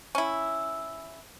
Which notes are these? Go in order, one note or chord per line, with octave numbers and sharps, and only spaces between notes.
C#4 E4